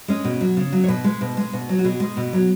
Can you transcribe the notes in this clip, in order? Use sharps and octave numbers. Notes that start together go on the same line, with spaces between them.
G#3 C#4
B2
F#3
C#3
F#3
C#5
B2 B4
G#3
B2
G#3
B2
F#3
F#4
B2 G#4
G#3
B2
F#3